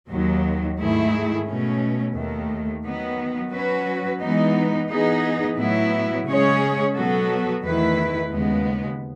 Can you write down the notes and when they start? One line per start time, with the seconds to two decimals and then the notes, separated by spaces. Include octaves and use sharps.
0.09 D#2 D#3 F#3
0.78 G#2 D#3 A3 E4 G#4
1.46 B2 A3 C#4
2.14 D#2 D#3 A3
2.83 D#3 F#3 B3
3.51 F#3 C#4 F#4 B4
4.20 E3 G#3 B3 D#4
4.88 E3 B3 D#4 G#4
5.56 A2 F#3 B3 E4
6.25 C#3 G#3 C#4 G#4 C#5
6.93 B2 F#3 B3 F#4 A4
7.63 E2 D#3 A3 E4 B4
8.30 D#2 C#3 G#3 B3